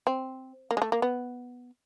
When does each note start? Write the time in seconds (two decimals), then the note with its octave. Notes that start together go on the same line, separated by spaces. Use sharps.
0.07 C4
0.71 A#3
0.77 G#3
0.82 A3
0.92 A#3
1.02 B3